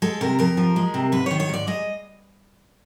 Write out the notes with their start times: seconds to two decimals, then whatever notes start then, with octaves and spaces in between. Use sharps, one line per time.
0.02 G#3 A4
0.21 C3 A#4
0.39 F2 A#4
0.57 F3
0.76 G#3
0.94 C3
1.12 G#2 B4
1.26 D#3 C#5
1.40 C#5
1.49 G#2 D5
1.67 G#3 D#5